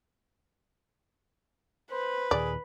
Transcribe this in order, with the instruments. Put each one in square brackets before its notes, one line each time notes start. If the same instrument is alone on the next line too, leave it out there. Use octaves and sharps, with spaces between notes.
[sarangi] B4 [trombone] C5
[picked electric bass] D#2 A#2 D#3 [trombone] G#4 [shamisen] D5